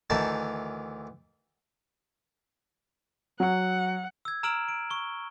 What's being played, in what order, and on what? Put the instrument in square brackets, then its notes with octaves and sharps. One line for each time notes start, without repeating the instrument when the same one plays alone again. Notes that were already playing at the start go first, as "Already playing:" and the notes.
[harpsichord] D2 D#3 E3 D#4 G#5 A5
[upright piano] F#3 [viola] F#5
[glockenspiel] E6 G#6
A#5 E6 F6 D7 E7 F#7
D7
C#6 G7